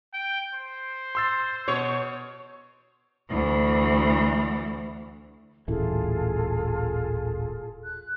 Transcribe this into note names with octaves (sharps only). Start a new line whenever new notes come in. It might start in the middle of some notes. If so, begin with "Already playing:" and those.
G5
C5
C6 E6 A6
B2 C#5
D2 E3
D#1 A1 E3 F4 G#4 A4
F#6